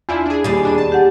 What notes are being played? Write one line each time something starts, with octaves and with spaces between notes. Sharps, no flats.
E2 D4 E4 F4
D4 G#4
D#2 G3 G#4 A6
B2 D4 D#7
A5
G4 F#5